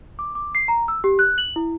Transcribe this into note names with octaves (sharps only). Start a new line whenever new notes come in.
D6
D6
C7
A#5
E6
G4
F#6
F#7
E4